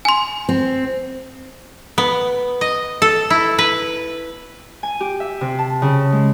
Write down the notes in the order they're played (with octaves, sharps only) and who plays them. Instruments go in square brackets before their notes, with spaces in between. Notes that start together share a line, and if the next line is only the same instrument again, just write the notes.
[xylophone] G#5 C6
[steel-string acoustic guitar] C4
[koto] B3
D#5
A4
E4
B4
[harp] G#5
G4
E5
C3
A5
C#3
G#3